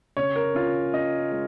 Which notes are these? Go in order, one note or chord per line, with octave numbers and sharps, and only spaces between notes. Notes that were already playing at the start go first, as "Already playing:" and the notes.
C#3 C#5
A#4
C#4 F4
C#4 D#5
G#3